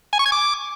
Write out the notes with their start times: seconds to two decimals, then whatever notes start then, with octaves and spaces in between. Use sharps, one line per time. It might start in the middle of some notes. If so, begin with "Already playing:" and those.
0.13 G#5
0.19 C#6
0.26 G#6
0.32 D6